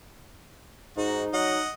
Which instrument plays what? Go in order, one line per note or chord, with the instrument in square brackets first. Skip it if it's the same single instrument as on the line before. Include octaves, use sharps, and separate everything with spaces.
[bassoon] G#2 [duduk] D#4 [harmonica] F#4
[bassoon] F#3 [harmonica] D#5 F#5